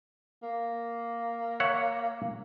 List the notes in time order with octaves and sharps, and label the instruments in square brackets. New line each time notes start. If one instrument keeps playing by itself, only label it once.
[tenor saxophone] A#3
[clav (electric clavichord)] C#5 E5 F#5